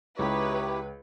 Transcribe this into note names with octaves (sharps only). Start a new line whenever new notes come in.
C#2 D#4 E4 G4 B4 C#5